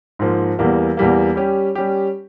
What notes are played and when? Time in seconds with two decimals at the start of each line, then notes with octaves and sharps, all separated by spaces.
0.19 G#2 F3 A#3
0.59 E2 E3 G3 A#3
0.97 E2 E3 G3 A#3
1.36 G3 C#4 G4
1.75 G3 C#4 G4